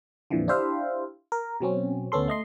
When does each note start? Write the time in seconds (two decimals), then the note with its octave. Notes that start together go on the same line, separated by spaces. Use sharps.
0.31 F2 A#2 D3 E3 F3
0.48 D4 E4 G4 C5 E5 F5
1.32 A#4
1.60 B2 F#3 C4 C#4
2.12 D2 B3 C#4 A4 C6
2.28 A3 D#5 C6